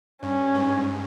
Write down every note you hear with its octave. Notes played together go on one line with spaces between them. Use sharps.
G2 C#4
G#2